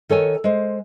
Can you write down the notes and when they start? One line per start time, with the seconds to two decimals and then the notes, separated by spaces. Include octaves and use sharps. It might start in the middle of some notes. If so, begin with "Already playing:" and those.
0.09 D#3 A4 C#5 G#5
0.44 G#3 C5